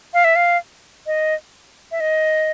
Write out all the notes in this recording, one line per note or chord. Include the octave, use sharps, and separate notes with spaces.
F5
E5
F5
D#5
E5
D#5